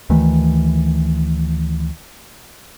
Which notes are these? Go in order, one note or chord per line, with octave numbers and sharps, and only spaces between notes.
D2 D#3 E3 A3